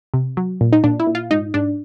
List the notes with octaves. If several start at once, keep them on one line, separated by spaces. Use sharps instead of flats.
C3
F#3
A#2
D#4
A#2 D4
E4
A#2
F4
G#2 D#4
G#2 D4